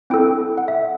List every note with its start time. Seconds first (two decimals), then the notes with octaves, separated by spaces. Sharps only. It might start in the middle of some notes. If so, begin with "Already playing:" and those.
0.10 C4 E4 A4 G5
0.58 F#5
0.68 E5